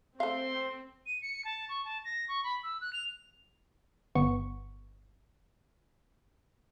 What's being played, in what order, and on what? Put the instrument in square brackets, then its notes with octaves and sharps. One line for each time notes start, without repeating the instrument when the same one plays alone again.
[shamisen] A3 F5 [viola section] C4 [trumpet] C6
[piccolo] D#7
C#7
A5
C#6
A5
A#6
C#6
B5
E6
F#6
F7
[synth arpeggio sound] G1 B3 C#6